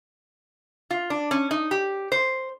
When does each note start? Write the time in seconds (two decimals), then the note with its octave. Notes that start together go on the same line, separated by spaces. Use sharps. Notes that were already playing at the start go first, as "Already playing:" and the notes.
0.91 F4
1.10 D4
1.31 C#4
1.51 D#4
1.71 G4
2.12 C5